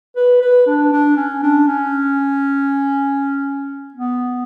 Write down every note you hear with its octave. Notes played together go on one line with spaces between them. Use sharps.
B4
B4
D4
D4
C#4
D4
C#4
B3